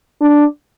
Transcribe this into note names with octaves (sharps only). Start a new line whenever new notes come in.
D4